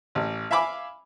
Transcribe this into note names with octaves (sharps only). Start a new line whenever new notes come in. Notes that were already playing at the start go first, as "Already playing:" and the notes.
A1
E5 F5 G#5 B5 D6